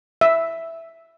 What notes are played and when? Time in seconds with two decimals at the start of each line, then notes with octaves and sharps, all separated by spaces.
0.21 E5